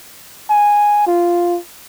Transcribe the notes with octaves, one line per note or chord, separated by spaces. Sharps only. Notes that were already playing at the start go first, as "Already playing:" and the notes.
G#5
F4